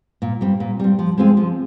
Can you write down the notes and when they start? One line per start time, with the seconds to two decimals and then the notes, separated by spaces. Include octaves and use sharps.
0.22 A#2
0.41 G3 C4
0.60 A#2
0.79 G3 C4
0.99 F3
1.18 G#3 C4 F4 G#4
1.37 F3